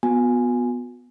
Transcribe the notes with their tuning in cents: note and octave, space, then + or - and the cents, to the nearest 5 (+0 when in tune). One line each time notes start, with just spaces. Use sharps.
B3 +0 F#4 -40 G#5 +0